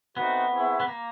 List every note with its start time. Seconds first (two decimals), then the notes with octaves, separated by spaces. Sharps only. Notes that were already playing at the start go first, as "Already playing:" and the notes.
0.16 A3 B3 C4 D#4 F#4
0.52 C4 E4 G#4 C#5 E5
0.80 B3
0.88 A#3